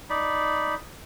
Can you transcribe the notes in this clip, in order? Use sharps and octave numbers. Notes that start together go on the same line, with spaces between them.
D#4 D5 B5